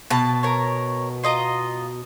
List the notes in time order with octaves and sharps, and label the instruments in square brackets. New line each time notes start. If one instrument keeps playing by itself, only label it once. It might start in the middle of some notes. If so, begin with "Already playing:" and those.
[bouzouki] B2 A5
[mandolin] A#4 C#5
F4 D#5 A#5